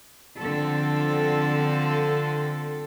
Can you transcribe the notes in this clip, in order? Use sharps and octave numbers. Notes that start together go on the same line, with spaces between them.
D3 F3 C4 A4